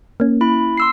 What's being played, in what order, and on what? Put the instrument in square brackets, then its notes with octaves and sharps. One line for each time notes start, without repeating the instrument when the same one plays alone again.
[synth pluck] A#3 C#4
[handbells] E4 B5
C6 E6 C7